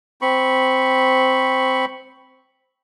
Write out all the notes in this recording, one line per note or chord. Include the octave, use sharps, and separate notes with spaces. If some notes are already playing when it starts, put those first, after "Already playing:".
C4 B5 C#6